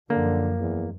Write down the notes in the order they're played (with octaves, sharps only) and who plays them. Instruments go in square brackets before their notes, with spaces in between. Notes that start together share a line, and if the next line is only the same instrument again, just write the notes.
[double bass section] F#2 F3 [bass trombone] D3 [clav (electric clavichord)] A#3
[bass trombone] E2